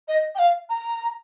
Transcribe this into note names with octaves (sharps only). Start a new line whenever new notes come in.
D#5
G5
F5
A#5